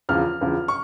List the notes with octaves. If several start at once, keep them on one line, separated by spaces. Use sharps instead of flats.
E2 C#3 F3 F6
E2 C#3 F3
C#6